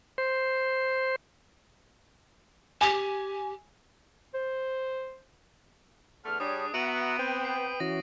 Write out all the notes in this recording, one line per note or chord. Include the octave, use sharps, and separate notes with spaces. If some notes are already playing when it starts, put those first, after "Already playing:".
C5
G4 G#5
C5
E2 D3 A3 F6
G3 D4 G#4 C#5 D#6
B3 F#4 E5 F#5 A#5 D7 D#7 F#7
C4 B4 G5
C7
E3 C#4 F#4 A#6